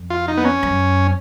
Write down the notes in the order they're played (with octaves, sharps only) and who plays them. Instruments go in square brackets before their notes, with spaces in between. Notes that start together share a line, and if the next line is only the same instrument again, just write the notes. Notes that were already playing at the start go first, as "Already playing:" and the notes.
Already playing: [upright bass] F2
[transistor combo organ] F4
D#4
B3
C#4
[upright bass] F#2